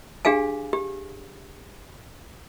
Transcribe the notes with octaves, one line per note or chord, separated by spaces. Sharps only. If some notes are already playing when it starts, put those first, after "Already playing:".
D4 G4 G#4 F5 G#5
G4